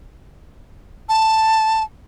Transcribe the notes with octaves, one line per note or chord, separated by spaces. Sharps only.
A5